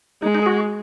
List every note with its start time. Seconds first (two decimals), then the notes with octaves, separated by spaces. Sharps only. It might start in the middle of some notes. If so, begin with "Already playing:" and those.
0.22 G#3 D#4
0.35 D#4
0.42 G#4
0.46 F#4